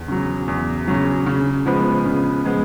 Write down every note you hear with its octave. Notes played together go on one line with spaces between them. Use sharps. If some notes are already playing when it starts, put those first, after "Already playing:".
Already playing: E2
C#3 F#3
E2
C#3 F#3
C#3
F3 G#3 B3
C#3
F3 G#3 B3